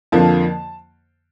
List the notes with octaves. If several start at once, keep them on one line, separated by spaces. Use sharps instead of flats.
F2 D3 F3 A#3 A5